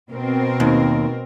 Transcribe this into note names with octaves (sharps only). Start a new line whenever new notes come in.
B2 C4 A#4
D#2